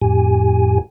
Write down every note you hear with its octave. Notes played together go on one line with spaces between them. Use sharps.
F2 A2 G4 G#5